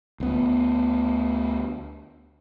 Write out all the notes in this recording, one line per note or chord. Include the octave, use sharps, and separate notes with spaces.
D2 B3